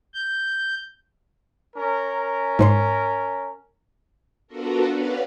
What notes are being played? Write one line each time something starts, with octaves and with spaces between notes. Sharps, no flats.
G6
C#4 A#4
G#2 C5 C6
B3 D4 F4 F#4 A4 A#4
C#4 B4 D5 F5 F#5